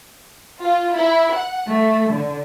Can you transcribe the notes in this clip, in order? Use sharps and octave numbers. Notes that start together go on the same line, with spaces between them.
F4
E4
F#5
A3
D3